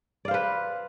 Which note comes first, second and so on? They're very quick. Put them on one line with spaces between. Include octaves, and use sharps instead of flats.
D5 F5 C5 B4